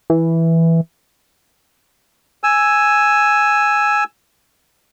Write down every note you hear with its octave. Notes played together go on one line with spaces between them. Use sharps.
E3
G#5 E6